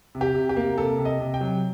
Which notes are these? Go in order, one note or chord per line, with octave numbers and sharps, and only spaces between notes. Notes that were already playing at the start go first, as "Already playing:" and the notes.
C3
G4
C3
G4
A#3
C3 A4
C3
D#5
C3
G5
F#3